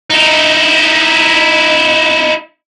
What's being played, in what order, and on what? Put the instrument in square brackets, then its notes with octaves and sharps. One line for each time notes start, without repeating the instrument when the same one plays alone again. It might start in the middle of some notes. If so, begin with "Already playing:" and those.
[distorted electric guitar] D#4 E4